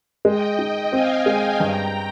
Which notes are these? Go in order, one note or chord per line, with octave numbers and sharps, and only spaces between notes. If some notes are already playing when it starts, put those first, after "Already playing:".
G#3 D#5 G5
D#4 D#5 G5
C4 F5 G#5
G#3
G2 G5 A#5